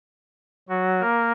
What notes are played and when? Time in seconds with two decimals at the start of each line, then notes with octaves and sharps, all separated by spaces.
0.69 F#3 F#4
1.01 A#3 A#4